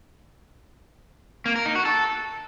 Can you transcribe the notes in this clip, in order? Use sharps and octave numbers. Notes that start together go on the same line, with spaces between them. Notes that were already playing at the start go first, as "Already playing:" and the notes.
A#3
A#4
D#4
F#4
A4